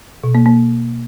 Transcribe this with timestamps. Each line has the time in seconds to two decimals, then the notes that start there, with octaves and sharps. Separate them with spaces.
0.24 B2
0.35 A#3
0.46 A#3